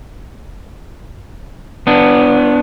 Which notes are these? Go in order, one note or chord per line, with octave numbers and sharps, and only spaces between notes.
B3 D4